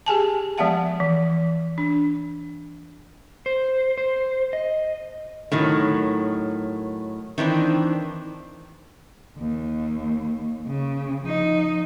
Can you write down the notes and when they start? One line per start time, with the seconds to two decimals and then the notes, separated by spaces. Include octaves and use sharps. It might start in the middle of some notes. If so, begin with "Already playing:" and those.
0.06 G4 G#4 G#5 A5
0.58 F3 G#3 B3 E5 F#5 A5
1.00 E3
1.78 D4
3.46 C5
3.98 C5
4.53 D#5
5.52 A2 D#3 F#3
7.38 D#3 E3 C4 D4
9.38 D#2
10.67 C#3
11.24 F3 D#4